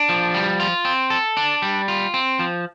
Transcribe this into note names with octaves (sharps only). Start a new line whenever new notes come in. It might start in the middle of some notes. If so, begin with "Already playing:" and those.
Already playing: D4
F3
G3
F4
C4
A4
D4
G3
F4
C4
F3